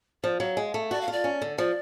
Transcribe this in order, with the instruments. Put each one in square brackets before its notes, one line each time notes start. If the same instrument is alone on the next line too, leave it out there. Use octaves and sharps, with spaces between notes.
[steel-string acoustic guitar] F3 [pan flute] D5
[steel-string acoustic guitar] F#3 [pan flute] F5
[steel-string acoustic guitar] G#3
A3
[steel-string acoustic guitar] F#4 [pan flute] D5
[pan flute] F5
[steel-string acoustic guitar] F4 [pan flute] D5
[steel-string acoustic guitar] C#4
D3
[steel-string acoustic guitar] F3 [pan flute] D5